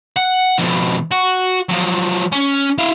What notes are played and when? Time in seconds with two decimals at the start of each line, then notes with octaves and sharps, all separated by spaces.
0.17 F#5
0.59 F2 B2
1.11 F#4
1.69 F3 F#3
2.32 C#4
2.78 E4 F5